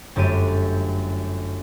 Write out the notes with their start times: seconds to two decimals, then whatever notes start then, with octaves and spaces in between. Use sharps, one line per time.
0.16 G1 F#2 A3 G4 D#7